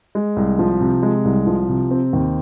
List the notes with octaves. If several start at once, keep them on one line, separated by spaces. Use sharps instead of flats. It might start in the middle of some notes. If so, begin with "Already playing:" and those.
G#3
C2
F3
C3
G#3
C2
F3
C3
C4
D#2